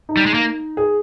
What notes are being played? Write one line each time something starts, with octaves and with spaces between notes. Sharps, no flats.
D#4
G3
G#3
A#3
G#4